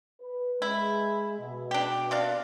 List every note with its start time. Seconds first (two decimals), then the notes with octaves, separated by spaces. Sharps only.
0.20 B4
0.62 G#3 E4
1.39 B2
1.71 D4 G4
2.11 C3 D4 F5